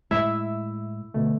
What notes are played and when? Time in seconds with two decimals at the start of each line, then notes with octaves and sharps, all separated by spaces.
0.11 A2 G#3 E4 E5
1.14 B2 D3 A3